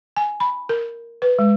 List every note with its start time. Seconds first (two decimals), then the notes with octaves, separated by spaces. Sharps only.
0.17 G#5
0.40 B5
0.69 A#4
1.22 B4
1.39 G#3